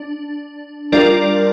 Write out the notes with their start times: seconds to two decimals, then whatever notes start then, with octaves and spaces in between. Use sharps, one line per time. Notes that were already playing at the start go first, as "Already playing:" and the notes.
Already playing: D4
0.92 G3 D4 F4 A#4 D5